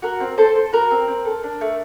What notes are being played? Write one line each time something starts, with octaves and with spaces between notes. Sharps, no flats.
F#4 A#4
C4
C4 A4 C5
A4
F#4 A#4
C4
C4
A4
D4
A3